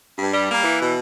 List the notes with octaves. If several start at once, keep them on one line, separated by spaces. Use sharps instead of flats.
G2
G3
A#3
E3
B2